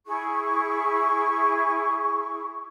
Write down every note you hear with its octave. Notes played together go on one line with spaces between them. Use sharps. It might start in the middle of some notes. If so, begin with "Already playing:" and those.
E4 G#4 C#6